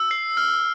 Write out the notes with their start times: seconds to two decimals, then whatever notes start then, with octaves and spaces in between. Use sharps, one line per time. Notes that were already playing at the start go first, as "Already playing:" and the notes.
Already playing: E6
0.11 C7
0.37 F6